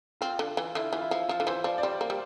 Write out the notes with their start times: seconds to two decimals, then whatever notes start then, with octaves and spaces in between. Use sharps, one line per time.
0.21 C4 F4
0.39 D3
0.57 E3
0.75 D3 E4
0.93 E3 F4
1.01 E4
1.11 F3
1.29 F3 F4
1.40 D3
1.47 E3 C5
1.64 F3 D5
1.78 D5
1.83 G3 C5
2.01 A#3
2.10 G3